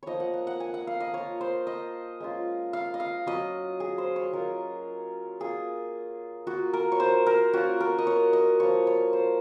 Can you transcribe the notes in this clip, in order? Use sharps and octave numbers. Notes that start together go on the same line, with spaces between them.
F3 A#3 D#4 C#5 D#5
F#5
F#5
F#5
G#5
F#5
F5
D#5
A#3 F4 C#5
C5
D#5
G#3 C#4 F4
F5
D#5
F5
F#3 C#4 F4 D#5
G#4
C5
C#5
F#3 C#4 F4 A#4
A#3 F4 G#4
A#3 F4 F#4
A#4
C#5
C5
A#4
A#3 C#4 F4 F#4
A#4
D#5
C#5
D#5
F3 A#3 F4 C#5
C#5
C5